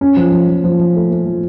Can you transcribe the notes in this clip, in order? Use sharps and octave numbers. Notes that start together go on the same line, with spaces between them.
C#4
F3
F3
F3
F3
F3
A3
A3
F3